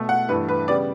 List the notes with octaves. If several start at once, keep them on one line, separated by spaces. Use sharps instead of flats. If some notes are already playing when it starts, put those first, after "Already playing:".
Already playing: B2 A3
F#5
G2 E3 A3 B4
B4
C#3 G3 B3 D5